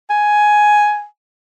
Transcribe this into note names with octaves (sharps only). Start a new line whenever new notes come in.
G#5